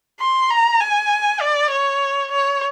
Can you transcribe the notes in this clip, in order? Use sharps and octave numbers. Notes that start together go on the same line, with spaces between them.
C6
A#5
G#5
D5
C#5
C#5